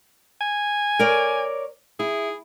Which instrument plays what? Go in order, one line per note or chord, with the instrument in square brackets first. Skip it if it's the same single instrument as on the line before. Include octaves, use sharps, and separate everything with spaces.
[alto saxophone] G#5
[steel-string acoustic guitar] A#4 C#5 D5
[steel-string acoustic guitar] E4 [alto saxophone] G#4